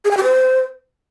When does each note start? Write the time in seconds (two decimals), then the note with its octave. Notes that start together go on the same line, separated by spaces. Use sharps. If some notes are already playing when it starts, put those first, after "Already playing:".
0.05 G#4
0.11 G#5
0.17 G4
0.23 C5